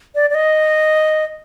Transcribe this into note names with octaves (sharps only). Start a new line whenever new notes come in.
D5
D5
D#5